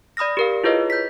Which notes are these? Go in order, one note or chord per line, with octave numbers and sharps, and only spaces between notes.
D5 B5 D#6 F6 A#6
G4 A#4 F5
E4 F4 G#4 B4 C#5 D#5
G6 B6